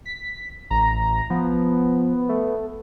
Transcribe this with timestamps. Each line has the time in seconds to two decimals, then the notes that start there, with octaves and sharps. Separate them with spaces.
0.05 B6
0.70 A1 A#5
1.30 F3 B3
2.29 A3